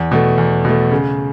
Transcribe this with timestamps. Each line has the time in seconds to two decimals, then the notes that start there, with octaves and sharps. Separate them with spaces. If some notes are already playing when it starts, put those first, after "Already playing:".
Already playing: E2
0.11 B2 A3
0.38 E2
0.65 B2 A3
0.92 C#3